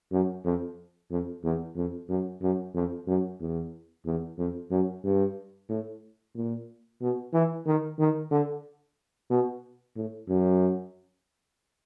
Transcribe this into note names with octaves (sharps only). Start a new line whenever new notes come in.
F#2
F2
F2
E2
F2
F#2
F#2
F2
F#2
E2
E2
F2
F#2
G2
A2
A#2
B2
E3
D#3
D#3
D3
B2
A2
F#2